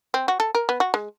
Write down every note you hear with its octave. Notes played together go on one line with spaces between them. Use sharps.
C4
F#4
A4
A#4
B3
F#4
G#3